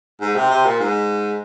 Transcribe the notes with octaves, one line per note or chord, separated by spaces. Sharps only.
G#2
C3
C3
A#2
G#2